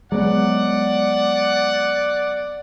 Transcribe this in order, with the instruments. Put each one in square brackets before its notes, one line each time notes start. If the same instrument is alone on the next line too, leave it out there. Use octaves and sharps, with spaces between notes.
[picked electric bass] F#3 B3 [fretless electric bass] G#3 [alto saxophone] D5 [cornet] F#5